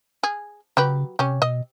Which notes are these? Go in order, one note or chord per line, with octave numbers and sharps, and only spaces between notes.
G#4
C#3 F#3 G4 B4
C3 C#4 G4
B2 D#5